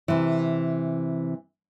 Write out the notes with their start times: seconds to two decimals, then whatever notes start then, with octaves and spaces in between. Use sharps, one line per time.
0.08 C3 E3